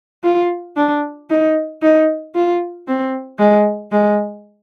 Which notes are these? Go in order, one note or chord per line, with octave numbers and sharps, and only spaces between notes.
F4
D4
D#4
D#4
F4
C4
G#3
G#3